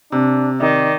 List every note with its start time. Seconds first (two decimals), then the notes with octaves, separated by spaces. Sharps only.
0.12 C3 D4
0.60 D#3 D5